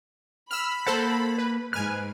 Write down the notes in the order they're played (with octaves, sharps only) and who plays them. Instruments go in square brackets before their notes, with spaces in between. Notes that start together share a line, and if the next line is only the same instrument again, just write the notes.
[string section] B5 [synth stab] E6 F6
[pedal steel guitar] A#3 A#4 F#5 [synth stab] A4 C5 A5
[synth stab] B4
[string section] G#2 [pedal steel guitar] B4 B5 F#6 [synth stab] G#5 F6